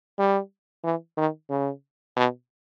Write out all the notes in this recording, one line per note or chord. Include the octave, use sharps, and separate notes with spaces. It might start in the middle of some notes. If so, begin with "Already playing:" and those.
G3
E3
D#3
C#3
B2